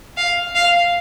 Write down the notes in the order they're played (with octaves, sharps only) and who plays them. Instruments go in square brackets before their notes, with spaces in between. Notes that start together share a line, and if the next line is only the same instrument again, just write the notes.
[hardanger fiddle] F5
F5